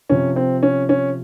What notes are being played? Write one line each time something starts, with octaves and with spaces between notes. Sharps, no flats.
C3 F3 C#4
C4
C#4
C#4